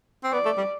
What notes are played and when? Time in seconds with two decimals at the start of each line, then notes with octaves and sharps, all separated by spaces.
0.24 C4
0.32 B3 D5
0.45 A3
0.58 G3